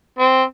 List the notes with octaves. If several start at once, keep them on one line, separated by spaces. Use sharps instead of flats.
C4